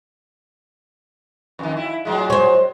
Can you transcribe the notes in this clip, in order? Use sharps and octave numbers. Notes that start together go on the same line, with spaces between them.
F2 D#3
E4
A2 F#3 G#3
C5 C#5